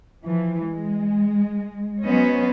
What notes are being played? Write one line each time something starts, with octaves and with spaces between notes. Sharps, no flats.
E3 F3
G#3
F#3 B3 C#4 C5 D#5